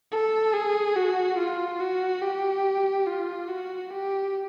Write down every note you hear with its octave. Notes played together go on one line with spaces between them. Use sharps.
A4
G#4
F#4
F4
F#4
G4
F4
F#4
G4